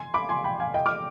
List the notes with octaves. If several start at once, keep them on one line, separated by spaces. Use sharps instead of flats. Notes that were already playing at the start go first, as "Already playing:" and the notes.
Already playing: G#5 C6
B5 D6
G#5 C6
G5 B5
F5 G#5
D#5 G5
D6 F6